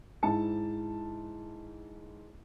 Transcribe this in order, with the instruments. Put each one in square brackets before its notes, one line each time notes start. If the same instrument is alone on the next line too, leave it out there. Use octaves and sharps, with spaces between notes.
[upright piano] G#2 E4 A5 C#7